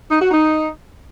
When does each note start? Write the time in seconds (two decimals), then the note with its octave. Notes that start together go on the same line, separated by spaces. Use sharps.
0.10 D#4
0.20 F#4
0.31 D#4